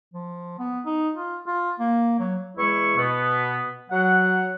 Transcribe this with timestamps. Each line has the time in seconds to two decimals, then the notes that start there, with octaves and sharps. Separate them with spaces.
0.13 F3
0.59 B3
0.85 D#4
1.15 F4
1.47 F4
1.80 A#3
2.19 F#3
2.57 E2 G#3 E4 C#6
2.97 B2 B3
3.90 F#3 F#5